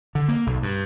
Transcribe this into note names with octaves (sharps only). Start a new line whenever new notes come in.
D3
A#3
B1
G2